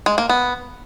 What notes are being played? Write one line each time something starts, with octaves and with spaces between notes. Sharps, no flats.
G#3
A#3
B3